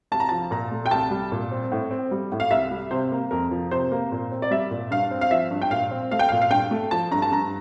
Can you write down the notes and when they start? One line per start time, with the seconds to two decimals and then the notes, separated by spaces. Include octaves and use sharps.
0.12 C2 A5
0.20 A#5
0.29 F3 A5
0.51 A#2 A#5
0.72 A3
0.86 G5
0.91 C2 A5
1.11 G3
1.32 A#2
1.51 C4
1.72 A2
1.91 C4
2.11 G3
2.32 A2
2.40 F5
2.51 C2 E5
2.71 G3
2.91 C3 C5
3.12 A#3
3.31 F2 A#4
3.51 F3
3.71 C3 C5
3.92 A#3
4.12 A#2
4.31 C4
4.42 D5
4.51 G3 E5
4.71 A#2
4.91 G2 F5
5.11 C4
5.21 F5
5.31 F3 E5
5.51 G2
5.62 G5
5.71 A#2 F5
5.91 C4
6.11 A3 F5
6.19 G5
6.29 F5
6.32 A#2
6.42 F5
6.51 G2 G5
6.71 A3
6.91 F3 A5
7.11 G2 A#5
7.22 A5
7.32 G2 A#5